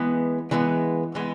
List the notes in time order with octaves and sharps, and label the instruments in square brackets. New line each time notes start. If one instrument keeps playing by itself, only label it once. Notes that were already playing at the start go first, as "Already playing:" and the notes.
Already playing: [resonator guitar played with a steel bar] E3 G#3 B3
E3 G#3 B3
E3 G#3 B3